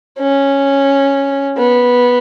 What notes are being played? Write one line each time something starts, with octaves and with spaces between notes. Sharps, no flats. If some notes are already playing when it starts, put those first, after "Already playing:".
C#4
B3